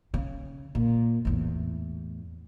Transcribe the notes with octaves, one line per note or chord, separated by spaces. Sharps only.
C#3
A#2
E2 A2